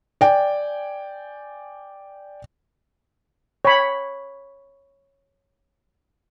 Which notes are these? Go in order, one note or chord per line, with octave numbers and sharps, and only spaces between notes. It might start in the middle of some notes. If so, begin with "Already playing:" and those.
D5 G5 G#5
C#5 B5